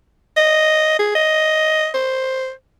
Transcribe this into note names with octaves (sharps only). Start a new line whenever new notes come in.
D#5
G#4
D#5
C5